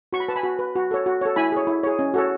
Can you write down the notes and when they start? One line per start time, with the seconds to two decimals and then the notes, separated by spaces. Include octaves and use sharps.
0.13 F#4 C#6
0.20 B5
0.29 B4 A5
0.36 G#5 B5
0.43 F#4
0.59 B4
0.76 F#4
0.91 A4 C#5
1.06 F#4
1.21 A4 C#5
1.36 E4 G#5 B5
1.52 G#4 C#5
1.67 E4
1.83 G#4 C#5
1.99 C#4
2.14 F#4 A4 C#5